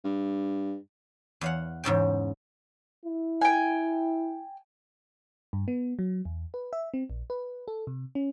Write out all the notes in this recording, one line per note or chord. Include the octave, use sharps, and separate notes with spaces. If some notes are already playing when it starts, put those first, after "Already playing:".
G2
E2 F5 F#5
E2 G#2 C#3 G5
E4
G5 G#5
G2
B3
F#3
E2
B4
E5
C4
A#1
B4
A4
C3
C#4